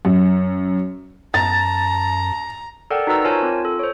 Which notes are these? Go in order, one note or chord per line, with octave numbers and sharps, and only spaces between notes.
F#2
F#2 A5 A#5 A6
A4 A#4 D5 F#5 G5
D#4 F#4 B4 A#5 E6
F4 A#4 C5 C#5 G#5 A5
C4 F4
A4
C5 C#5